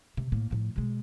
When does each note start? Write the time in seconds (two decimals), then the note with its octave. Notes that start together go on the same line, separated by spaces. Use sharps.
0.17 C3
0.32 A2 A#3
0.51 A2 F3
0.76 B2 G#3